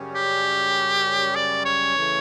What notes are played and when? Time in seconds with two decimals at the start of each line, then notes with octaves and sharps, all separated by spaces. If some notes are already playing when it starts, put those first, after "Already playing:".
Already playing: F#2 C#3 G3 C#4
0.15 G4
1.35 D5
1.65 C#5
1.96 C#3 E3 A3